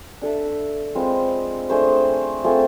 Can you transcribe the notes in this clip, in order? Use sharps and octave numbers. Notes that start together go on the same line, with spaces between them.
D4 A4 E5
G#3 C4 F4 B4
A3 D4 G#4 C5
A3 C4 F4 G#4